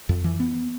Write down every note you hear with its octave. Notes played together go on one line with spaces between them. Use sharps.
F2
E3
B3